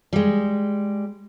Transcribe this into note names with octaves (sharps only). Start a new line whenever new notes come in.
G3 G#3